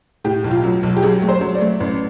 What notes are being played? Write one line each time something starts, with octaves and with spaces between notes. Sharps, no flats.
A2 G4
B1
F4
F#3
B1
G4
F#3 G#4
A3
C5
F#3
D5
A3
A1